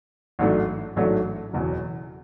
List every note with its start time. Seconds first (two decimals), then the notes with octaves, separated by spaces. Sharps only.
0.39 A1 G#2 F#3 A3 D4
0.96 A1 G#2 F#3 A3 D4
1.53 F#1 E2 B2 F#3